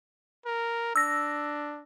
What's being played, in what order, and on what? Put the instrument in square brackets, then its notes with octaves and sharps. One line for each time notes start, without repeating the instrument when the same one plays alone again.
[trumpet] A#4
[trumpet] D4 [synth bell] E6 A#6